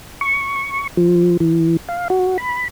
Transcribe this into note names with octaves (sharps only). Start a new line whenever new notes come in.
C#6
F3
E3
F5
F#4
B5